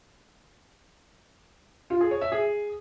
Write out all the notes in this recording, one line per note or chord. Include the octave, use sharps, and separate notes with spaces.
F4
G#4
C#5
E5
G#4